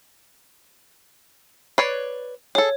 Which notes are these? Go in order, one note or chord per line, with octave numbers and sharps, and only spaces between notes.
B4 C#5 D5 C7
G#4 A4 C#5